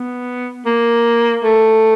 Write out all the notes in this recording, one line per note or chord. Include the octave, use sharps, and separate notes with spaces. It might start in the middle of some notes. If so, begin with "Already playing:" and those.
Already playing: B3
A#3
A3